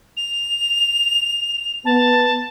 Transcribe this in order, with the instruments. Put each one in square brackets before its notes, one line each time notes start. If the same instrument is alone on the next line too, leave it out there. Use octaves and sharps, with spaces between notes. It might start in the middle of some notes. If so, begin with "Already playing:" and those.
[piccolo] F7
[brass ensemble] B3 [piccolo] A5